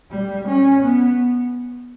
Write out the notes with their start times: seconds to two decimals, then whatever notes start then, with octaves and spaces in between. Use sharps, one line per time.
0.11 G3
0.47 C#4
0.83 B3